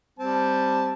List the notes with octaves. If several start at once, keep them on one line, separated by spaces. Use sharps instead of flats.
G3 C4 A5